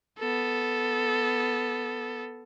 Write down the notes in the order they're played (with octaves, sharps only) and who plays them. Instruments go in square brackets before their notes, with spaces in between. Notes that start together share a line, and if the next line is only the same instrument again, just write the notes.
[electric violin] B3 A4